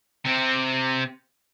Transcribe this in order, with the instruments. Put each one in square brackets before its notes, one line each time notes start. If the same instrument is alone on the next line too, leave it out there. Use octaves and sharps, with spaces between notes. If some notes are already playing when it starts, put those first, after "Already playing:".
[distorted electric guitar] C3 C4